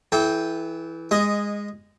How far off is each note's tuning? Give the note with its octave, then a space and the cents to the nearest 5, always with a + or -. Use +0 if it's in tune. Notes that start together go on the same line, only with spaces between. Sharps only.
E3 +0 A4 -35 G5 +0
G#3 -15 D#5 +0